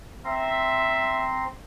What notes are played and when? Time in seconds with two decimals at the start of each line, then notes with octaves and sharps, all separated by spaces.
0.25 C4 E5 A#5 C6